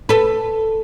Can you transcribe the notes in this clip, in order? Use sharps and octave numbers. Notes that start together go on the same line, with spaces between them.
A4 B4